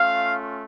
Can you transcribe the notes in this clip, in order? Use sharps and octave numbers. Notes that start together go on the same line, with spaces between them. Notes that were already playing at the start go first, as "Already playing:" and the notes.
Already playing: A3 C#4 F4 F5